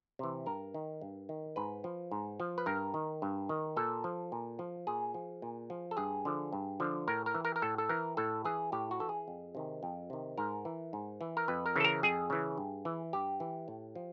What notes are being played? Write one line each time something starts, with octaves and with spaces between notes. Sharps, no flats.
C3 E3
G2 A#4
D#3
G2
D#3
G#2 B4
F3
G#2
F3
B4
G2 A#4
D#3
G2
D#3
A#2 A4
F3
A#2
F3
A#2 G#4
F3
A#2
F3
A4
G2 G#4
D3 F3
G2
D3 F3
A2 A#4
A#4
E3
A#4
A#4
A2 A4
A4
E3 A#4
A2 A4
E3 G#4
A2 G4
F#4
E3 A4
G#4
F2
C3 D#3
F2
C3 D#3
G#2 A#4
E3
G#2
E3
A#4
F2 B4
A#4
C#3 E3 A4
A#4
F2 G#4
C#3 E3
G2
E3
G2 G4
E3
A2
F3